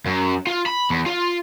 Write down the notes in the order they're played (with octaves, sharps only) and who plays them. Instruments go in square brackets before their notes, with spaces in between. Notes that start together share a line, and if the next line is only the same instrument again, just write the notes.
[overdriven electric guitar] F#2
F4
B5
E2
F4